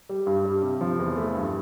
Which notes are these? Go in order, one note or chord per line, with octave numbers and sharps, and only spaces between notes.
G3
G2
G3
C3
F3
E2
A3
G2